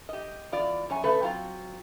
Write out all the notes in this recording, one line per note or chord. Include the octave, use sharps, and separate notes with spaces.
G4 D#5
E2 F4 D5
F#2 C#5 G#5
C#3 A3 B4
F#3 C4 F4